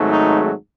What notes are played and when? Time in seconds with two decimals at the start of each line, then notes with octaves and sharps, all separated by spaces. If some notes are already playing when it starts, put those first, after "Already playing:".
Already playing: G#1 G#2 F#3 A3
0.12 D#4